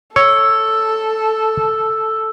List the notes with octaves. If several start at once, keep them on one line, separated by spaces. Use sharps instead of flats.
A4 C#5 E6